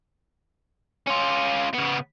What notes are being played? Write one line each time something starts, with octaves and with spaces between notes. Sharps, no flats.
C#4 F4
C#3 B3